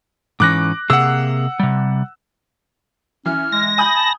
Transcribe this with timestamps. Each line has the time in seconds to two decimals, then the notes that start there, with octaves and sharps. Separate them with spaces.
0.40 G#2 E3 C#4 D6 F#6 A#6
0.90 C3 A#3 G#4 F#5 E6
1.60 C3 G3
3.26 E3 C#4 F6
3.52 G#3 A#6
3.78 G#5 B5 D#6 G6
3.95 A5